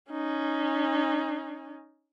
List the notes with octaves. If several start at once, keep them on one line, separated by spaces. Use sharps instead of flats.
C#4 D#4